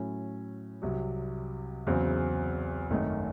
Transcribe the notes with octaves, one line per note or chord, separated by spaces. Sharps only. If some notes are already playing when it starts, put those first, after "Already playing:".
Already playing: A2 F#3 C#4
C2 C3 F#3
E2 C#3 F#3 C4
G#1 F#2 D#3 A3 C#4